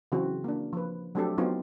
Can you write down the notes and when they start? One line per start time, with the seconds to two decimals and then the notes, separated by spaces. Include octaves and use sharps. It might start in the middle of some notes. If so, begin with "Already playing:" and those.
0.12 C#3 E3 F#3 C4 F#4
0.44 A#3 D4
0.73 F3 B4
1.15 F#3 A3 C4 D4 G4 A4
1.38 F#3 B3 C4 D#4 F4